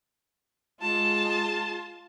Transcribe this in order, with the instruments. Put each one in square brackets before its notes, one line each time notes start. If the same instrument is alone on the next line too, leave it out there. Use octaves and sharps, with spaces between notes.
[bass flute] G#3 [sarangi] F4 [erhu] A5